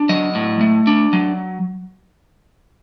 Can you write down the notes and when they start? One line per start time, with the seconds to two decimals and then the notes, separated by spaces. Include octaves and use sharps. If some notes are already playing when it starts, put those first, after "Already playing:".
Already playing: D4
0.09 F#3 D#5
0.35 A2
0.61 A3
0.87 D4
1.13 F#3